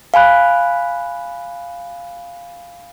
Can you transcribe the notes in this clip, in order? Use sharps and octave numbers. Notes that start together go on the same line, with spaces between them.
F5 G#5 B5 F#6